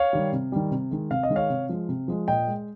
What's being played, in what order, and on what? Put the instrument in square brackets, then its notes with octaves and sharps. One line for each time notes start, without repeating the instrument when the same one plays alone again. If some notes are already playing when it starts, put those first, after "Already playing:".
Already playing: [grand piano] C#5 F5
D#3 G3
C3
D#3 G3
C3
D#3 G#3
C3 F5
D#5
D#3 G#3
C#5 F5
C3
F3 G#3
C3
F3 G#3
A#2 D#5 G5
G#3